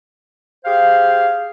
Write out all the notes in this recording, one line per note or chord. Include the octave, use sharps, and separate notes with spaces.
G4 G#4 C5 F5